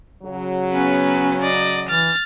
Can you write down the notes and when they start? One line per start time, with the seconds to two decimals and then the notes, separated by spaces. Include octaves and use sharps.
0.23 C#3 F#3
0.73 B3 C#4 B4
1.41 D5 D#5
1.89 E3 F6 A6